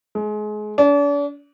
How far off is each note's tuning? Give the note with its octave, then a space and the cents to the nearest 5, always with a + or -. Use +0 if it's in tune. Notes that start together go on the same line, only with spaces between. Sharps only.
G#3 +30
D4 -40